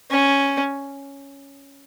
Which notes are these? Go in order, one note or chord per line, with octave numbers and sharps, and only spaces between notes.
C#4